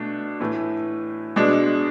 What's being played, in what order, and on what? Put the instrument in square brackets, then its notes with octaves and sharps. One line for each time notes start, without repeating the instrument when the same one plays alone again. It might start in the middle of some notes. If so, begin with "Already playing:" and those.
Already playing: [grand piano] B2 A3 D4
A2 E3 A3
B2 G#3 D4